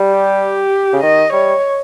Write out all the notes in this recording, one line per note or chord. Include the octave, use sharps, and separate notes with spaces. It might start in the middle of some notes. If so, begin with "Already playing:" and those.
Already playing: G3
G4
C#3
D#3 D#5
G3 C#5